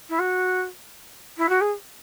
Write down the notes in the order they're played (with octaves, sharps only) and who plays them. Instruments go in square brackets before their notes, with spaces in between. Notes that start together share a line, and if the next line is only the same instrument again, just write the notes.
[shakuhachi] E4
F#4
E4
F#4
G#4